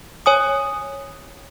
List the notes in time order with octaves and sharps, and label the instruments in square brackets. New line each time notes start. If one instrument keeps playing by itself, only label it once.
[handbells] C#5 G#5 D#6